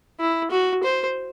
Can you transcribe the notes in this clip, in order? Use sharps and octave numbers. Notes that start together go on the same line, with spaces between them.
E4
F#4
C5